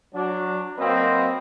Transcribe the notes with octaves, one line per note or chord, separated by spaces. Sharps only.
F#3 D4
F#3 A#3 C4 B4 D#5